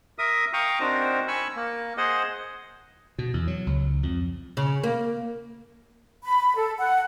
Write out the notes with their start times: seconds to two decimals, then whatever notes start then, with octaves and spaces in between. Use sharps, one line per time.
0.19 A#4 E5 D#6
0.53 F5 G5 A#5 C#6 D#6
0.80 C4 D4 D#4 F#4 A#4 C5
1.28 G#5 B5 C#6 E6
1.56 A#3
1.97 G#4 C5 D#5 F#5
3.18 B2
3.34 E2
3.47 F#3
3.67 C#2
4.03 F2
4.57 C#3
4.84 A#3
6.24 B5
6.56 A4
6.77 F#5